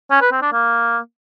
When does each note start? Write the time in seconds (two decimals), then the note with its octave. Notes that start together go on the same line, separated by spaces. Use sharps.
0.11 C#4
0.21 B4
0.32 C4
0.42 D4
0.53 A#3